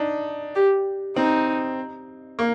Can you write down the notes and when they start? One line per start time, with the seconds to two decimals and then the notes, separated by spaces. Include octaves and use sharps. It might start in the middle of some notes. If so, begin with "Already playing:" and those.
Already playing: D4 D#4
0.55 G4
1.16 C4 D#4
2.39 A#3